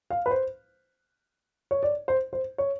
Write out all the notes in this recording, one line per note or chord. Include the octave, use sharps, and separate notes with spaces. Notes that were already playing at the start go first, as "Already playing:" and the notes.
F5
B4
C5
C#5
D5
C5
C5
C#5